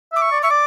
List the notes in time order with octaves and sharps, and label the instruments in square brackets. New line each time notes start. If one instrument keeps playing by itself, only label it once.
[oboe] E5 [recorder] D6
[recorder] C#6
[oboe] D5
[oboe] E5 [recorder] C#6
[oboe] D5 [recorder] D6